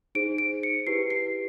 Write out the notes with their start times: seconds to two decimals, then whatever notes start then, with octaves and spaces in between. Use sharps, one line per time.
0.15 D#4 G#4 C5 D7
0.38 D7
0.63 C#7
0.87 E4 G4 B4 C7
1.10 C7